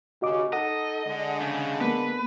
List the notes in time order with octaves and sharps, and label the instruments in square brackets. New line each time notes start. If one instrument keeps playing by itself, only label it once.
[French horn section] D#2 C#3 [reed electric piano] F#4 D#5 D6
[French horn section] D#4 A4 [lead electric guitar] D#5 [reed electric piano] F#5
[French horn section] D3 G#3
[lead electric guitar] C#3
[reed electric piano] A#3 B3 [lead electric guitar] B4